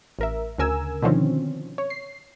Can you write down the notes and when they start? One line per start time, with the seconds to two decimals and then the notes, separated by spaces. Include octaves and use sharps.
0.19 A1 A#4 E5
0.58 D2 C#3 A#4 G#5 E6
1.02 B2 D3 D#3 F3 C4 C#4
1.78 C#5
1.90 C7